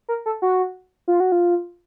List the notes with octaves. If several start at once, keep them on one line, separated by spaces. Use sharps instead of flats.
A#4
A4
F#4
F4
F#4
F4